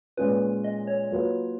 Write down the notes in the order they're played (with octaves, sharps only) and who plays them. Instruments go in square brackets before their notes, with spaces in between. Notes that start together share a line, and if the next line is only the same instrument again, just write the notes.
[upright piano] A#2 G#3 C#4 F4 [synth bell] B4
[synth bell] D#5
C#5
[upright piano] F#3 A#3 F4 B4